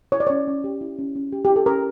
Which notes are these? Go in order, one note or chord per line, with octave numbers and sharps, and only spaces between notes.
E4 C#5
D5
C#4 C#5
C#4
G4
E4
C#4
C#4
G4
E4 G4
A4
C#4 A#4